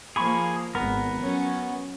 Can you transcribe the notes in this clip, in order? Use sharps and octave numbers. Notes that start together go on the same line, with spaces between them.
F3 A#3 G#4 B5 C#6
G#1 B3 A#4
F#3 C#4